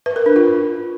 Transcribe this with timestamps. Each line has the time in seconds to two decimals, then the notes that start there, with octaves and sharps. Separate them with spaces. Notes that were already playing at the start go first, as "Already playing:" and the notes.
0.06 B4
0.16 A#4
0.26 D4
0.36 F4